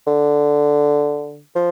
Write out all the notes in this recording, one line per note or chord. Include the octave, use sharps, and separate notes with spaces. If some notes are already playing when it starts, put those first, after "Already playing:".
D3
F3